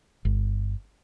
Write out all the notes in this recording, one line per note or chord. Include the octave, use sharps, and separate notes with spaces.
G1